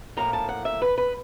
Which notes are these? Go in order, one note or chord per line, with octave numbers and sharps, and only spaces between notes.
A2 F3 A#3 A#5
A5
F#5
E5
B4
B4